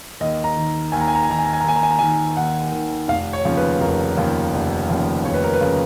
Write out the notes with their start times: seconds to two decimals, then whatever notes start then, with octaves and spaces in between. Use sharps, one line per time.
0.20 D#2 D#5
0.44 A#5
0.57 D#3
0.92 D#2 G#5
1.01 A#5
1.08 G#5
1.15 A#5
1.23 G#5
1.29 D#3 A#5
1.38 G#5
1.45 A#5
1.53 G#5
1.60 A#5
1.64 D#2 G#5
1.76 A#5
1.83 G#5
1.91 A#5
1.99 D#3 G#5
2.37 D#2 F#5
2.72 D#3
3.08 F1 F5
3.33 C#5
3.45 D#2 C#3 F3
3.57 B4
3.80 F1 A#4
4.17 D#2 C#3 F3
4.54 F1
4.89 D#2 C#3 F3
5.25 F1 C#5
5.34 B4
5.44 A#4
5.54 B4
5.61 C#3 F3